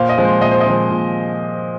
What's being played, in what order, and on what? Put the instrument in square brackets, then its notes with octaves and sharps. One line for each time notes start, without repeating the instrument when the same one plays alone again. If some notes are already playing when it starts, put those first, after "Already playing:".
Already playing: [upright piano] A#2 C5 F5
D#5
F3 G#3 C4
C5
A#2 D#5
C5
D#5
F3 G#3 C4
A#2